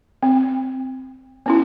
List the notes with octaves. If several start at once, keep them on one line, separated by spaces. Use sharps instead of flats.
C4
B3 C#4 E4